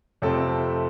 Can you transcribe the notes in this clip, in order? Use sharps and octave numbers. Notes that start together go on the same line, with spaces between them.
F2 C3 F3 A3 C4 A4